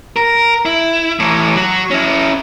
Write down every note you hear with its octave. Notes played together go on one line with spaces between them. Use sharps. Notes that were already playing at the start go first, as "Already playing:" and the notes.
A#4
E4
A2 E3
F#3
C#4 E4